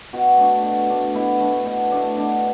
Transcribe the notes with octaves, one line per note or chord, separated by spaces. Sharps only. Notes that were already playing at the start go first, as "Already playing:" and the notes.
B2 F#4
A3 D4
B2
A3 D4
B2 E4
A3 D4
B2
A3 D4
B2 D4